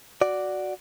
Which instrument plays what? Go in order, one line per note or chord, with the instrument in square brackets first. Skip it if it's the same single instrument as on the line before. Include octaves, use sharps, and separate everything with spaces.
[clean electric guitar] F#4 D5